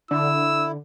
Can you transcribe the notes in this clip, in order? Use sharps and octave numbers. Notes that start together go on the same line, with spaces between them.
D3 E4 E6